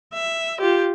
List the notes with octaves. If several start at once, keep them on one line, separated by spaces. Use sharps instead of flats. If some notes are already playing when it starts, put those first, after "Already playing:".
E5
F4 G4